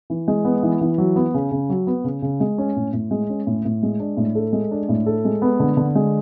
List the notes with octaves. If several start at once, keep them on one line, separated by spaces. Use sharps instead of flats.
E3
G#3
B3
E3
E3
F#3
B3
C#3
C#3
F#3
B3
C#3
C#3
G#3
C#4
A2
A2
G#3
C#4
A2
A2
G#3
D4
A2
A4
G#3
D4
A2
A4
G#3
B3
D3
D3
G#3